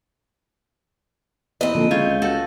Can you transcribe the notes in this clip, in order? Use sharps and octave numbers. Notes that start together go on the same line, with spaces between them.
E2 C4 B4 D#5
A#2 D3 F3 A4
C#3 G#3 F4 C#5 G6
C#2
F#4 A4